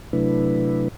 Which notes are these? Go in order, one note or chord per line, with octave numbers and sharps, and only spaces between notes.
C3 F#3 A3 D4 E4 B4